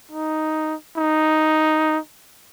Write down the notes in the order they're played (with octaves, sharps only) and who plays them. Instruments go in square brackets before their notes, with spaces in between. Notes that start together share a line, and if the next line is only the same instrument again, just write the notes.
[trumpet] D#4
D#4